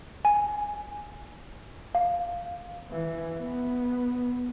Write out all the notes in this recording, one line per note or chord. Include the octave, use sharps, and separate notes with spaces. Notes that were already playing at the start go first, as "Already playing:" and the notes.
G#5
F5
E3
B3